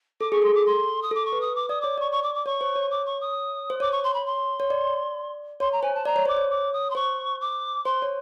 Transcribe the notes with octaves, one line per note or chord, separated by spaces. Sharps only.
A4 D6
G#4 C#6
A4 C6
D6
C6
D#6
A4 D6
C#6
B4
D#6
D6
D5 D#6
C#5 D6
D5 C#6
C#6
D6
D6
C#5 C#6
C5
C#5
D6
C#6
D#6
C5
C#5 D6
C#6
C6
B5
C6
C#5
D5
C#5 C6
A#5
C5 G#5
A5
D5 A#5
C#5
C5 D6
C#5
D6
D#6
C6
C5 C#6
D6
C5 C6
C#5